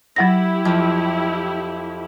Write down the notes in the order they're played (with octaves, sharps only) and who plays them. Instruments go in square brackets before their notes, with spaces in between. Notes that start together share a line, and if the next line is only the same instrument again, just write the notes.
[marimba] F#3 F#5 A#6 [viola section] E4 G4
[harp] F2